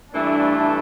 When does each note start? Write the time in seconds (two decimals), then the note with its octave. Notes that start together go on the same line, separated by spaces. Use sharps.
0.13 G2 E3 A3 D4